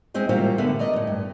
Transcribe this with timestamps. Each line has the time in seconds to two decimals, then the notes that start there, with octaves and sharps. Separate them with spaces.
0.14 G#3 C4 E4 C5 D#5
0.29 C3 E3 G3 A#3 F4 F#4
0.58 D2 D3 B3 B4 E5 F#5
0.79 A#4 D5 D#5
0.93 F#2 A2
1.07 G2